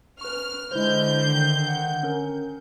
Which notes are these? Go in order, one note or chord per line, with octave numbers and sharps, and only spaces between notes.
B4 C#6 F6
D3 G#3 E4 C5 G6
D#3 C7
F#5
C#4 A#4